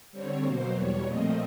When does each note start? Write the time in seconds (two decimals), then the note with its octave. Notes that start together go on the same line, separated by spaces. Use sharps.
0.12 D3 G3 C4 C#5
0.42 B2 F#3 A#3 C5
0.73 E2 B2 G3 C#5
1.03 A#2 F3 A3 C4 D#5